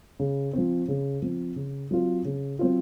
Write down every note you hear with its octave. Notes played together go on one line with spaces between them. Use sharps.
C#3
F3 C4
C#3
F3 C4
C#3
F#3 C4 F4
C#3
F#3 C4 F4